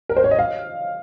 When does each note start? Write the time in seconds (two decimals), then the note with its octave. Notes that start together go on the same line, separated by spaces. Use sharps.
0.09 A#4
0.16 C5
0.24 C#5
0.31 D#5
0.39 F5